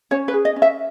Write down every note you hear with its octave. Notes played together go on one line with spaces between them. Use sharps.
C#4 C#5
B4
G#4
D#5
C#4
E5